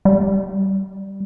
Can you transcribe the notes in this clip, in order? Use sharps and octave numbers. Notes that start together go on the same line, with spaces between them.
G3